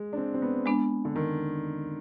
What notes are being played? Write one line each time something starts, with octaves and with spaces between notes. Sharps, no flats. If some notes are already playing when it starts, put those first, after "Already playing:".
Already playing: G#3
D4
C4
C4
B3
G#3 B3 D4
D3
D#3